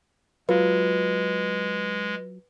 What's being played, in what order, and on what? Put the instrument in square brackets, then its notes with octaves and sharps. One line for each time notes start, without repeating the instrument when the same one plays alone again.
[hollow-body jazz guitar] F#3 F4 [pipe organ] G#3 [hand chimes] B4